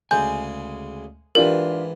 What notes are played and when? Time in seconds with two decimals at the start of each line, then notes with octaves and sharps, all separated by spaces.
0.11 D2 C#3 G#3 G#5 G6
1.35 G#2 E3 D4 F4 G4 A#4